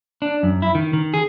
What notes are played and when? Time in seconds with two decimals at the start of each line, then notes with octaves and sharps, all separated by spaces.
0.22 D4
0.43 F#2
0.62 E4
0.75 D#3
0.93 D#3
1.14 G#4